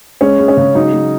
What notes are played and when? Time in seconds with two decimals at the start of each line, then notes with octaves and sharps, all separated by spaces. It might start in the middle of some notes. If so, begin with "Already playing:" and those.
0.21 G#3 C#4
0.39 G#3
0.48 C#4
0.57 C#3
0.75 F#3 D#4
0.93 F#3